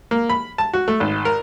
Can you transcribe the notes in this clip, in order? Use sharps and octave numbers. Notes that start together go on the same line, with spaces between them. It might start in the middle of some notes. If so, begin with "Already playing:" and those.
A#3
B5
A5
F#4
A3
G#1
A#4